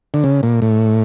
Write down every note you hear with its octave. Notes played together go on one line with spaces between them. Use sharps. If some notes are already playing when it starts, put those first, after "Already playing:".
D3
C#3
A#2
A2